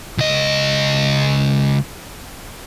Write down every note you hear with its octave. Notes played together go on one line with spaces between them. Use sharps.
C#2 D#5